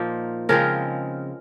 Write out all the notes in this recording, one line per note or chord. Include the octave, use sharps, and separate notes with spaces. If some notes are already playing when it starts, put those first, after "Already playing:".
Already playing: A#2 F3 A#3 D#4
C#3 F3 G#3 C4 A#4